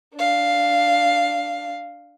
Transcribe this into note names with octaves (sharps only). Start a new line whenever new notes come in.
D4 F5